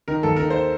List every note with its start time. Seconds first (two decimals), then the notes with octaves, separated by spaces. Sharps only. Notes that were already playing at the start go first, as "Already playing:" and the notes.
0.08 D#3 A#4
0.23 D#2 A4
0.36 D#3 A#4
0.50 C5